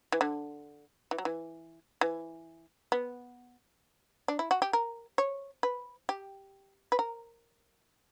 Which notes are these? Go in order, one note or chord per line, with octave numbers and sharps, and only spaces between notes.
E3
D3
E3
F#3
E3
E3
B3
D4
E4
F#4
G4
A#4
C#5
B4
G4
B4
A#4